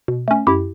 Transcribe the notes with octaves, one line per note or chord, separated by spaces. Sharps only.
B2
A3 C#4
F#2 E4 G4